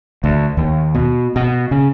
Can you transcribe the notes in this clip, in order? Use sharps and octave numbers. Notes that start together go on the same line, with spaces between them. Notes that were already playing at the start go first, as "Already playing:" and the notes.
D2
D#2
B2
B2
C#3